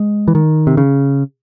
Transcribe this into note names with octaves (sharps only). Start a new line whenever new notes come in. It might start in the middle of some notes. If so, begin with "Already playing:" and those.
Already playing: G#3
E3
D#3
C3
C#3